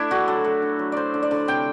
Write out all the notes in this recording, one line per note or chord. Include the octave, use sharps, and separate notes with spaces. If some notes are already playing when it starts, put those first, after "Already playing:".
Already playing: A3 D4 E4
D3 F#4
F#3 A4
A3
D3
F#3
D3 C5 D5
D3
D5
D3
C3 G5